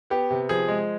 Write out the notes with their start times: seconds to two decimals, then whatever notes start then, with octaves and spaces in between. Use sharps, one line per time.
0.10 B3 G4
0.31 C3
0.49 F3 G#4
0.68 G#3